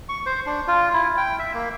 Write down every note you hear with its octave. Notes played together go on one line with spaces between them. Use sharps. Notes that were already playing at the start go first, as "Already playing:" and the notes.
C#6
C5
D4
F4
E4
G5
E5
A#3